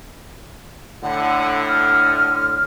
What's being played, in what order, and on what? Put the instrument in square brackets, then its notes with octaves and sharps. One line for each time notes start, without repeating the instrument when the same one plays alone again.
[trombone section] A2 D3 [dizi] F#5
[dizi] F6